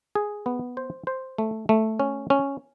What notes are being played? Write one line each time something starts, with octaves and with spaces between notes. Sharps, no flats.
G#4
B3
C5
C5
A3
A3
C#4
C#4